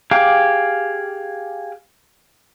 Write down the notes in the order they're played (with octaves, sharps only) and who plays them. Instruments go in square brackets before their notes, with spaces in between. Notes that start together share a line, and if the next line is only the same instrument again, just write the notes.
[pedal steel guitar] G4 G#4 F5 G5 D6